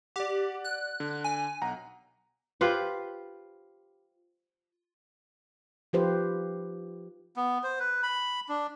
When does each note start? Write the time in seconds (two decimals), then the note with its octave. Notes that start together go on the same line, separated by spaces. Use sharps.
0.16 G4 D5 F#5
0.64 F#6
1.00 D3
1.24 G#5
1.62 B1 F#5 A#5
2.61 F4 G4 B4 C5
5.93 F3 D#4 F4 G4 B4 C5
7.36 B3
7.64 C5
7.80 B4
8.03 B5
8.49 D4